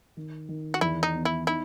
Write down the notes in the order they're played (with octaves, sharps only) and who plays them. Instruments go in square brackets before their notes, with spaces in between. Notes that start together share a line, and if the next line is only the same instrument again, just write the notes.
[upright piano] D#3
D#3
[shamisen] F#4
[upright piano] E2 [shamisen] E4
[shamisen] D#4
[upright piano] B3
[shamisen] E4
[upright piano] D#4 [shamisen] E4